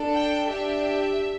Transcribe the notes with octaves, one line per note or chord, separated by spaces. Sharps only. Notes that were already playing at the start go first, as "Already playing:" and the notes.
Already playing: D4 A4
G5
D4 G4 E5